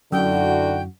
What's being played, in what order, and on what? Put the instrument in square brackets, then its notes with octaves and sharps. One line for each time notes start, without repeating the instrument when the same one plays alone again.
[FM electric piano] F#2 [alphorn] D3 [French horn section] D#4 E4 F#4 [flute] G5